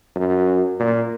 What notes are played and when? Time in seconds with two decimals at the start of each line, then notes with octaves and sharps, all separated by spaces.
0.16 F#2
0.80 A#2